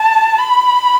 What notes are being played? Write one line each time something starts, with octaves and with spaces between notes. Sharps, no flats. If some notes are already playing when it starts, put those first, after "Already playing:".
Already playing: A5
B5